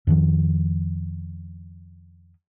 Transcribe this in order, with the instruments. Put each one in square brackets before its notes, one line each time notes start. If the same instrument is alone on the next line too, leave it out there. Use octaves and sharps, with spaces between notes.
[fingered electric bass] F2 D#3 F3